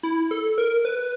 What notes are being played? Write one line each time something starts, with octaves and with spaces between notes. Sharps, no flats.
E4
A4
A#4
B4